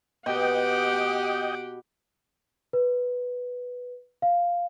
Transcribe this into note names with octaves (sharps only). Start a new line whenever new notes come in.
B2 G4 D#5 F#5 G5 D6
B4
F5